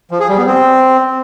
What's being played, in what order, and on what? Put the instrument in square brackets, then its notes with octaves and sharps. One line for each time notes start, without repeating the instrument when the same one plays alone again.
[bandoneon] F3
G#4
G3
B3
C4